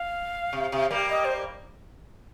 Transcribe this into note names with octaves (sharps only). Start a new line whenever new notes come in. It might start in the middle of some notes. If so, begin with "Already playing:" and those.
Already playing: F5
C3
C3
G3 A#3
D#5
C5